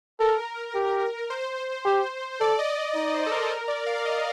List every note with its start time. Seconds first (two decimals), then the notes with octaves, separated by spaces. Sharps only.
0.20 A4 A#4
0.75 G4
1.30 C5
1.85 G4
2.40 A4 D5
2.59 D#5
2.77 D5
2.95 D#4 D#5
3.14 C5
3.26 A4
3.32 A#4
3.42 A4
3.50 A#4
3.68 D5
3.86 F5
4.05 D#5